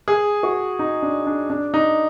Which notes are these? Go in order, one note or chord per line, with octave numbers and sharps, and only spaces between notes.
G#4
F#4
D#4
D4
D4
D4
D#4